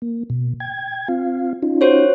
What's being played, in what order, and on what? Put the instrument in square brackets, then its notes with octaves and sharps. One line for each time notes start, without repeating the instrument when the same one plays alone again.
[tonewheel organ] A#3
B2
G5 G#6
C4 F4 F5
C#4 D#4 F4
[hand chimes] F#4 C5 C#5